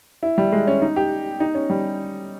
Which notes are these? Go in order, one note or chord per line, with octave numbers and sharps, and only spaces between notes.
E4
G3
G#3
C#4
D#4
G4
D#4
C#4
G3